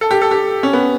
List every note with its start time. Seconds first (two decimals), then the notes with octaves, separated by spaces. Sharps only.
0.01 A4
0.11 G4
0.22 A4
0.31 G4
0.63 C#4
0.73 B3